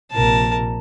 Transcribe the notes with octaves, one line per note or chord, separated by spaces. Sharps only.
A#1 C3 A#4 A5